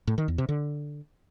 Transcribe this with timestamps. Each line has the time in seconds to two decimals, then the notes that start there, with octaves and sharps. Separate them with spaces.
0.07 A2
0.18 D#3
0.28 E2
0.38 C3
0.49 D3